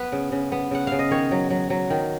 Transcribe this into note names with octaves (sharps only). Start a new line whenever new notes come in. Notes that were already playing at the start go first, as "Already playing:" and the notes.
Already playing: B3 B4
C#3
C#3
B3
C#3 F#5
C#3 F5
D#5
D#3 C#5
F#3
F#3
F#3
D#3